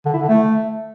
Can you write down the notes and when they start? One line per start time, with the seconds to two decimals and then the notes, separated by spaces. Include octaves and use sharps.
0.06 D3
0.13 E4
0.21 D3
0.29 A3